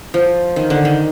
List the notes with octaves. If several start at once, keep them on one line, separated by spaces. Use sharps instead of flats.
F3
D#3
D3
D#3